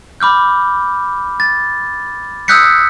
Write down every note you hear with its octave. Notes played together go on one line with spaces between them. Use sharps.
B5 D6 F6 G6
A6
D#6 E6 F#6 G6 B6 C#7